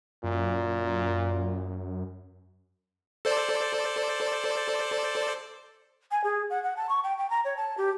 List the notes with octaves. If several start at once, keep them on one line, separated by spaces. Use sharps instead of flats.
F#2 A#2
A4 C5 D5
G#5
G#4
F#5
F#5
A5
C#6
G5
G5
A#5
C#5
A5
G4